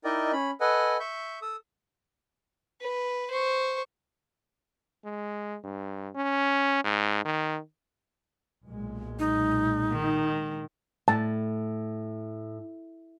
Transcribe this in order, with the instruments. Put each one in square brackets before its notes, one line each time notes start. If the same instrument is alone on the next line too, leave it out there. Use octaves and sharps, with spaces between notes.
[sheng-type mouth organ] D#4 E4 A#4 D5 D#5 G5
C#4 B5
A4 B4 D#5 F#5 G#5
E5 C#6 G6
A4 D#6 E6
[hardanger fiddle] B4
C5 C#6
[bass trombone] G#3
G2
C#4
G#2
D#3
[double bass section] B1 A#2 G#3
[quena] D#4
[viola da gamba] D#3
[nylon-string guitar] A2 [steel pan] A5